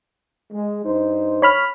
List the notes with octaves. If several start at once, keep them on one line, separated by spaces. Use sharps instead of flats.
G#3
G2 D#4 C5
C#5 B5 F6